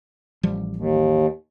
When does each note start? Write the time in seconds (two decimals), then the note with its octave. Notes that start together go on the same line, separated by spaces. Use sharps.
0.43 A1 F3 G3
0.76 D#2